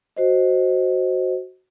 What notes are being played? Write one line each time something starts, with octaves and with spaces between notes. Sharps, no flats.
F#4 C5 D#5